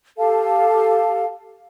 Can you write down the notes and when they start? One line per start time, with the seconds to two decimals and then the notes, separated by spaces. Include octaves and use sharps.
0.17 G4 A4 F5 A5